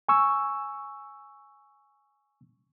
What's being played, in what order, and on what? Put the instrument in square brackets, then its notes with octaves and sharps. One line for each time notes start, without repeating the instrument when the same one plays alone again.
[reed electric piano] G#5 C#6 E6